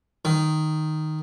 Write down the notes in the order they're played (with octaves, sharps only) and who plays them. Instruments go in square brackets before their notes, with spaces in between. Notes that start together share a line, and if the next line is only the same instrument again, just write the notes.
[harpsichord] D#3